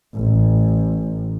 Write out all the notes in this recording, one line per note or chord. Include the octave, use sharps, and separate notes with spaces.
A1